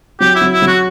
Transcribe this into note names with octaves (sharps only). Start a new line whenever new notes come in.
F#3 G4
E4
F#3
E4
F#3
F#4